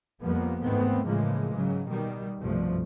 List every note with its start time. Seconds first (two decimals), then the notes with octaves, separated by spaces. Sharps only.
0.22 F2 F3 G3 A#3 B3
0.61 E2 G#2 D#3 A3 B3 C4
1.06 A2 C#3 E3 F3 G#3 A#3
1.54 G#2 C#3 F#3
1.88 B2 D#3 G3
2.39 C2 G2 B2 F3 A3